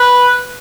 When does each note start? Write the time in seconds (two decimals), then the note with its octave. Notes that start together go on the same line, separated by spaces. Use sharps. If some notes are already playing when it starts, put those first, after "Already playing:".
Already playing: B4